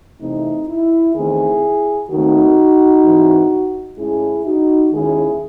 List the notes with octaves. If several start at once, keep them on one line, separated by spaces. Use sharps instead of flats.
E2 C3 E3 A3 C4 D#4
E4
E2 D#3 A3 C4 E4 G#4
D#2 D#3 A3 C4 D#4 F#4
G#2 E3 C4
A2 G#3 C#4 E4 G#4
D#4 F#4
D#2 D#3 G#3 C#4 E4 G#4